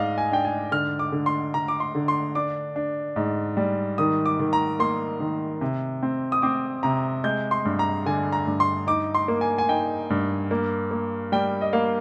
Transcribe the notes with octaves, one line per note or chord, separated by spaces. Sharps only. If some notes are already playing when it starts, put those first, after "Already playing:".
Already playing: G#2 D4 D5 D#5 F5
G#5
D4 G5
G#5
D3 F6
D6
D3
C6
D3 A#5
D6
C6
D3
C6
D4 D6
D4
G#2
G3
D#3 D#6
D6
D#3
A#5
A#3 C6
D#3
C3
C4
D#6
C4 D6
C3 A#5
G#3 G6
C6
G2
A#5
D3 G#5
A#5
G2
C6
D#4 D6
C6
A#3
G#5
G#5
D#4 G5
G2
A#3
A#3
G3 G5
D#5
A#3 F5